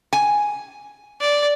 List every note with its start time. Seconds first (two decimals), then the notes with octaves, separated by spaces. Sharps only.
0.13 G#5
1.21 D5